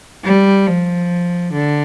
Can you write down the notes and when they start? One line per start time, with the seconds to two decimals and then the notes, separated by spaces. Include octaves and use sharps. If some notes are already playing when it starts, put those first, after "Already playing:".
0.24 G3
0.67 F3
1.53 D3